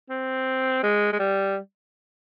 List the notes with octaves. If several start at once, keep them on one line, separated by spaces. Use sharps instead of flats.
C4
G#3
G#3
G3